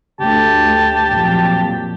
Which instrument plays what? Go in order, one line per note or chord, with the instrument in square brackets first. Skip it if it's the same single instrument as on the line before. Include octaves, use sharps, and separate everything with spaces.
[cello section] D2 [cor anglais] G4 [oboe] A5
[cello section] F2 A#2 F#3